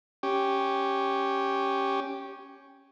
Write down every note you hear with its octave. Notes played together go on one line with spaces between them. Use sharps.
C#4 G4